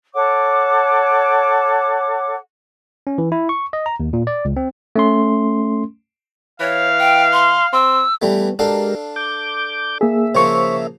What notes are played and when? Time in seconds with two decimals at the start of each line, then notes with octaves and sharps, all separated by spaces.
0.13 A4 C#5 F#5 D6
3.07 C#4
3.18 E3
3.32 E4
3.49 C#6
3.73 D#5
3.86 A#5
4.00 D#2
4.13 A#2
4.27 D5
4.45 C#2
4.56 C4
4.96 A3 C#4 C6
6.60 E3 C#5 F5
6.99 G5
7.33 C6
7.73 C4 E6
8.22 E3 G3 A3 B3
8.59 G#3 D4 G4 A4 A#4 F5
9.16 D6 G6
10.01 A#3 G#4 E5
10.35 C#3 F3 A#3 C5 C#6